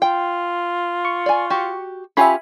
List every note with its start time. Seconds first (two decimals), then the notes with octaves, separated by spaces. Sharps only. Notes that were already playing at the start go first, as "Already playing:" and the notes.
0.02 F4 G5
1.05 C#6
1.26 D5 G#5
1.50 F#4 G4
2.17 C#4 F4 G4 E5 G#5 B5